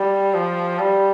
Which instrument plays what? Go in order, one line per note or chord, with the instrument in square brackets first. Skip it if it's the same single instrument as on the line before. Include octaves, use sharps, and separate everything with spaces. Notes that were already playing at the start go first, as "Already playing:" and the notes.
Already playing: [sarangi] G3
F3
G3